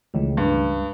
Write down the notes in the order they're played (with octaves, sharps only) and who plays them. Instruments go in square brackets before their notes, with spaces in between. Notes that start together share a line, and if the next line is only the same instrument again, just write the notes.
[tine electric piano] C#2 [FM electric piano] D#3 E3 A3
[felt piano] G2